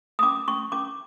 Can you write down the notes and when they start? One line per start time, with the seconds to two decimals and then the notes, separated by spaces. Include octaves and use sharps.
0.19 D#6
0.23 C#4 D6
0.48 C#4 C#6
0.72 C#4 D6